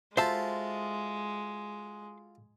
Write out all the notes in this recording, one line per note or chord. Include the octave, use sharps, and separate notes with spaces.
G#3 F4 F#4 A4 C5 E5 A5